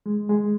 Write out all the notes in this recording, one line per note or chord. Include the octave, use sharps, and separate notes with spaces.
G#3
G#3